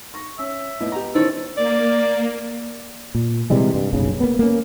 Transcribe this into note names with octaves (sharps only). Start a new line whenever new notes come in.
C#6 A#6
C#4 E5
A2 B3 D#5
G4 A#5
D#3 E3 C#4 D#4 A4 C5
A#3 D5
A#2
C3 E3 G3 G#3
G2
F#1 B1 C#3
A#3 B3
A#3 C#4